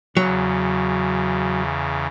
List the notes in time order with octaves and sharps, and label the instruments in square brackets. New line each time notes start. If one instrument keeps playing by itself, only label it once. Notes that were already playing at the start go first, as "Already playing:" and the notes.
[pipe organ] E2 C#3 [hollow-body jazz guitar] F#3